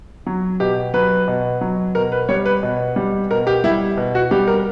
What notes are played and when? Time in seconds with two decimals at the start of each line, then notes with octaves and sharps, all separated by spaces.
0.26 F#3
0.60 B2 G4
0.94 F#3 B4
1.28 B2
1.61 F#3
1.95 B2 A#4
2.12 B4
2.29 G3 C#5
2.46 B4
2.63 B2
2.96 G3
3.30 B2 A#4
3.47 G4
3.64 G3 E4
3.97 B2
4.15 F#4
4.31 G3 G4
4.48 A#4